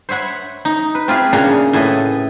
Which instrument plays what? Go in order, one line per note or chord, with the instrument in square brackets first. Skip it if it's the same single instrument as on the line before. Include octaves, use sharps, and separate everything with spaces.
[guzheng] C5 C#5 E5 F#5 B5
D#4
B4
C4 E4 F4 G4 G#4 B4
A#2 C#3 D4 G#4 A5 A#5
A2 E4 G#4 A4 B4 D#5